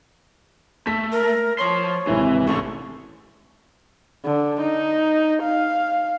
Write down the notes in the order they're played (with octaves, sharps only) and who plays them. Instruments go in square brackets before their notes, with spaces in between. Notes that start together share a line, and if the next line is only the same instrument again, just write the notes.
[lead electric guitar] A3 [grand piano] B6
[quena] A#4
[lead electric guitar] F3 C6 [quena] C#5
[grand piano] G#1 C3 E4 [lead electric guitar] E3
[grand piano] A1 [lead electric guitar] C#3 A4 [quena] C#6
[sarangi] D3
D#4
F5